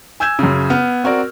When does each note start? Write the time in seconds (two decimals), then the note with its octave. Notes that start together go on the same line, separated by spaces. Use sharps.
0.20 G#5 E6 G6 G#6 E7
0.39 F#2 C#3
0.70 B3 F6
1.04 C4 F#4 A#4 D5